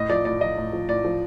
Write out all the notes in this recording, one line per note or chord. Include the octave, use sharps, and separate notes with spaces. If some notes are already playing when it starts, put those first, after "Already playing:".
Already playing: A2 D#5
F3 D5
A2 D5
F3 D#5
A2
F3
A2 D5
F3